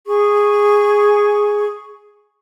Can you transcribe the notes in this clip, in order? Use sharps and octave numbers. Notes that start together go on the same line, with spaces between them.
G#4 C#6